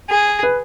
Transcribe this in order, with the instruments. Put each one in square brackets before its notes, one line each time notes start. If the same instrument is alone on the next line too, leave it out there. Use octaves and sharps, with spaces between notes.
[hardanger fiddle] G#4
[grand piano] B4